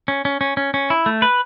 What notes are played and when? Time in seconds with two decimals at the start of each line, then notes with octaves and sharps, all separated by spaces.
0.08 C#4
0.25 C#4
0.41 C#4
0.57 C#4
0.74 C#4
0.90 E4
1.06 A3
1.22 B4